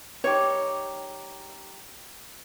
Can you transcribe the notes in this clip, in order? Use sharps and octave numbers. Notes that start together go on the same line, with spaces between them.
G3 D#4 G4 C#5